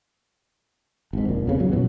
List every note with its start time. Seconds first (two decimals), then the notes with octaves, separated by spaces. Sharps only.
1.13 G#1 G#2
1.29 F1 A#2
1.46 F1 F2 C#3 B3
1.59 A1 F#3
1.72 F#2 B2 E3 F#3